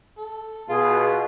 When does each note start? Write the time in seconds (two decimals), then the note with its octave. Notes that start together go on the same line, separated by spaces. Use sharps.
0.17 A4
0.69 B2 F4 G#4